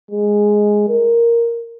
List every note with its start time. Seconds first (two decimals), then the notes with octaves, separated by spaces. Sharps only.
0.11 G#3
0.88 A#4